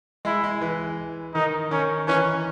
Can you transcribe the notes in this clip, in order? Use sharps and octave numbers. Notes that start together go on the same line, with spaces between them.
G#3 E4
G#3
E3
D#3 D#4
D#3 C#4
E3 C#4